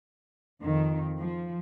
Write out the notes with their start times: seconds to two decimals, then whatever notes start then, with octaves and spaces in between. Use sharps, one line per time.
0.62 F2 D#3
1.19 F3